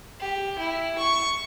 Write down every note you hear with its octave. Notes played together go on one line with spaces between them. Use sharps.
G4
E4
C#6